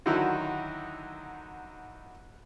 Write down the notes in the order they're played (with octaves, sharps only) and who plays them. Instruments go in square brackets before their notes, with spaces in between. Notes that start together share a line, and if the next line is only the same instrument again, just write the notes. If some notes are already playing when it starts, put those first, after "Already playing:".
[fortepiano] D3 D#3 F#3 D#4 E4